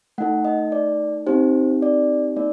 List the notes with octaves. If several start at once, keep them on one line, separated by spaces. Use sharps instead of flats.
A3 D#4 A4 F#5
D#5
D5
C4 D#4 G4 C5
D5
A#3 D#4 D5